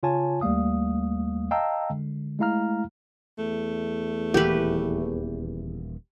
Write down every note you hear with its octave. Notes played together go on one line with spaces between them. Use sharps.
C#3 F4 C#5 G#5 A5
D#2 G3 A3 A#3 F5 D#6
D#5 F5 G5 A5 A#5 E6
D3 G#3
G#3 A3 E4 F5 A#5 F6
E2 A3
D#1 E3 A#3 G4 B4